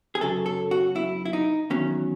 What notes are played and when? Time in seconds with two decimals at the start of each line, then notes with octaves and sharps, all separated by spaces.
0.15 G#4
0.21 F#2 C#3 F#3 A4
0.46 A4
0.71 F#4
0.96 E4
1.25 E4
1.33 D#4
1.70 E2 D#3 F#3 C#4